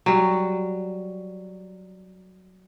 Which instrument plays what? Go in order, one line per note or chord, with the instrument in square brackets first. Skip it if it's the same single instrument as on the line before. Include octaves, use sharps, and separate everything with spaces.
[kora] F#3 G3